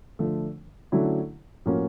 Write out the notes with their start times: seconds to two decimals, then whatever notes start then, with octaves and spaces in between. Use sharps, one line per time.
0.19 D3 F3 A3
0.92 D3 F#3 A3 C#4 E4
1.66 A2 F3 A#3 C#4 F#4